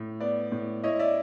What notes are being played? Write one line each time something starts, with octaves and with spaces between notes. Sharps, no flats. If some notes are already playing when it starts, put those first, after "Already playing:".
Already playing: A2
B3 D5
A2
E4 C#5 D#5
D5 E5